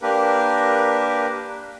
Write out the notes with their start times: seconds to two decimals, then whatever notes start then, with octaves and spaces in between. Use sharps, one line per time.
0.02 A#3 D4 G4 A#4 B4